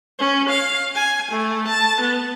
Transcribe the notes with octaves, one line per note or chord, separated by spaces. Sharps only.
C#4
F5
G#5
A3
A5
B3